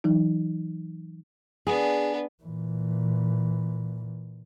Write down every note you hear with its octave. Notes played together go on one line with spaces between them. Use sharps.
E3 F#3 D#4
B3 D4 G#4
A#2 E3